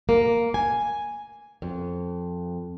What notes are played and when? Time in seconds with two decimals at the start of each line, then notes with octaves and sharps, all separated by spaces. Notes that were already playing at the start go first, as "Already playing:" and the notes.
0.09 A#3
0.54 G#5
1.62 F2